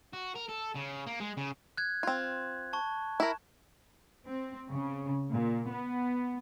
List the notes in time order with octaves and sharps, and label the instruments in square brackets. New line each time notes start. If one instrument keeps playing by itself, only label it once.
[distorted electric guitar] F#4
A#4
A4
C#3
A#3
G#3
C#3
[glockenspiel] F#6 G#6
[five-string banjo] C4 F4
[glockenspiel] A5 C#6
[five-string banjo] E4 A#4
[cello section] C4
C#3
A#2
B3